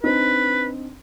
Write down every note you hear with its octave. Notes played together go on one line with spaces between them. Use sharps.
C4 D4 D#4 B4